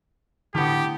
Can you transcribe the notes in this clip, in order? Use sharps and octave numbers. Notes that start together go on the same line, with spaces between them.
A2 D3 D#3 B3 G4